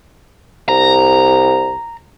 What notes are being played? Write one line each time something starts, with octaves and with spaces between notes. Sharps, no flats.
C2 A#5